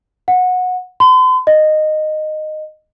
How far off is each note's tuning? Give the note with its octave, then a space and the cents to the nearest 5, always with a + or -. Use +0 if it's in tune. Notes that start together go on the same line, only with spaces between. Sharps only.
F#5 -20
C6 -45
D#5 -15